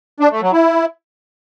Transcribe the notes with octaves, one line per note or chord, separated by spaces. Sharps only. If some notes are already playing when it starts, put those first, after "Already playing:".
D4
A3
F#3
E4